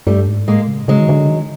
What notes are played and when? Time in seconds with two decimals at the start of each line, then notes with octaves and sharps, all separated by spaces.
0.07 G2 G3 A3
0.27 G#2
0.47 A2 G#3 A#3
0.68 C#3
0.88 C#3 F#3 G#3
1.00 D#3
1.09 D3
1.29 D#3